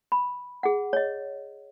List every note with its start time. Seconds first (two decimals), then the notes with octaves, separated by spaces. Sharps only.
0.12 B5
0.63 G#4 F#5
0.93 C#5 D#5